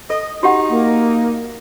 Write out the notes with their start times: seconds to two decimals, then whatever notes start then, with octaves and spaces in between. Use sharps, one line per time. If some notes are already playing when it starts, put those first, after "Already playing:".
0.10 A4 D#5
0.43 D#4 F#4 G4 F#5
0.70 A#3